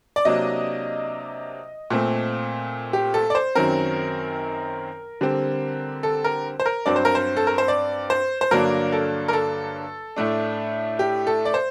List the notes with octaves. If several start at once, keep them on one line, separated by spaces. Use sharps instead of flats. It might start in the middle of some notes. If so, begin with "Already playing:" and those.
D5
C3 F#3 A#3 D4 D#5
A#2 A3 C4
G4
A4
D5
C5
F#2 D#3 F#3 C4 A#4
D3 G3 C4
A4
A#4
C5
A#4
G2 F#3 C4 D5
C5
A#4
C5
A4
A#4
C5
D5
C5
C5
G2 D3 F#3 A#3 D4 A#4
A4
A#4
A4
A2 A3 D4
G4
A4
D5
C5